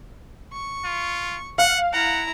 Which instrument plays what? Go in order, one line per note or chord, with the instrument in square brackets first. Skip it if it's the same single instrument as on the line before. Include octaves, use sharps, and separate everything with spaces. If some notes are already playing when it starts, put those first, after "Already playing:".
[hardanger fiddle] C#6
[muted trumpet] F4
[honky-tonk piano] F5 [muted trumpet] F#5
[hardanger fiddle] E4 A#5 [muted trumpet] F#5